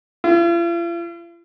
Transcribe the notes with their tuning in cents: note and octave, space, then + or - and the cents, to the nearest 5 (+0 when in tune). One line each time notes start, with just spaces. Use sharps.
F4 -45